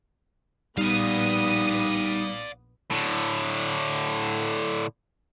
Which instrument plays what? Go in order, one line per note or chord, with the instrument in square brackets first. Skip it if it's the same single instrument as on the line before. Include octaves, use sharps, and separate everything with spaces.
[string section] A#1 B3 D#6 [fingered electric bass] G3 [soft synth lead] D#4 [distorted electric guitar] D5 F5
[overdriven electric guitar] A2 D3